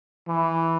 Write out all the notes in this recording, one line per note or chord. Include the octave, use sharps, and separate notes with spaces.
E3